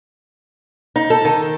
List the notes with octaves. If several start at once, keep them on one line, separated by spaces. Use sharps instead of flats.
D#4
A4
D#3